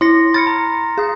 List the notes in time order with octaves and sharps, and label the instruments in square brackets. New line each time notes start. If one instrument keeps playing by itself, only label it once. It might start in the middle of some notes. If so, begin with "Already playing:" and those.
[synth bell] E4 C#7 [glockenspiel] C6 A#6
[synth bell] B5 F6 C#7 [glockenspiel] A6
[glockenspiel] A#5
[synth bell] G#4 D#6